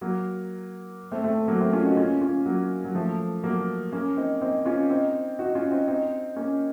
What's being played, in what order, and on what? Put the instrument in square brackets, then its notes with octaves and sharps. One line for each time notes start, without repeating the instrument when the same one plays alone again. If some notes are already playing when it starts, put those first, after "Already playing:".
[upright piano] F#3 A#3
A3 C4
A3 C4
F#3 A#3
A3 C4
C#4 F4
D#4 F#4
C#4 F4
C#4 F4
F#3 A#3
F#3
F3 A3
F#3 A#3
A#3 C#4
C4 D#4
C4 D#4
C#4 F4
C4 D#4
D#4 F#4
C#4 F4
C4 D#4
C4 D#4
A#3 C#4